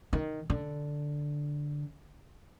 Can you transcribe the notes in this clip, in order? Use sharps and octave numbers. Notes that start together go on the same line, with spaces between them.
D#3
D3